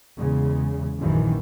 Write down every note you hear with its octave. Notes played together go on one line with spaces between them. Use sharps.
E2 C#3 G#3
A#1 F#2 D#3 E3